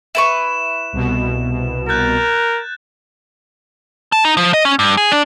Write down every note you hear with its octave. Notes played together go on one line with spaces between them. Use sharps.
E4 B4 C#6 E7
C2 B2
A#4 F#6 G6 A6
A5
D#4
F3
D#5
C#4
G2
G#4
D4